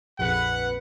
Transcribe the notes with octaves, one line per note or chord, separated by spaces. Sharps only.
A#1 F2 B4 F#5